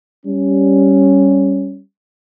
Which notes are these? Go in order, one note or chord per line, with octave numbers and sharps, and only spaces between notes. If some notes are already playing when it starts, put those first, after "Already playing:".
G3 C#4